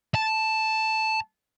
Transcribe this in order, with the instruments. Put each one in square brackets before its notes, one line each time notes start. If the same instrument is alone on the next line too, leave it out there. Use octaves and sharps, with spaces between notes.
[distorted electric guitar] A5